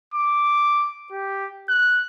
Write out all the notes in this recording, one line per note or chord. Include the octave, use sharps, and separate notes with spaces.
D6
G4
F#6